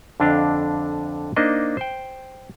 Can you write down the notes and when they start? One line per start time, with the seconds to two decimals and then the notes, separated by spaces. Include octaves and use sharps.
0.20 F2 D3 D4 D#5 F5
1.36 A#3 D4 D#4 C5 D#5
1.77 C5 G5